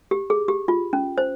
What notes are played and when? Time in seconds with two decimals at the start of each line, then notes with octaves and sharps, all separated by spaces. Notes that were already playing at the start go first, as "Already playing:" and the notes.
0.11 G4
0.30 G#4
0.48 G4
0.68 F4
0.93 C#4
1.18 C5